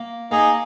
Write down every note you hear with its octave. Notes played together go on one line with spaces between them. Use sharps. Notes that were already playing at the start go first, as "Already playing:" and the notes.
Already playing: A#3
A#3 D#4 G#4